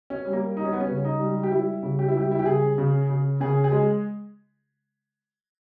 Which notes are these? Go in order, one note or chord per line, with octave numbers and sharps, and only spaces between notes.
C#4
G3
A#3
G3 D#4
C#4
B3
C#4
C#3
D#4
G3
G4
G3 E4
C#3
G4
E4
G3 G4
E4
G4
C#3 G#4
C#3
C#3
C#3 G#4
G#4
G#3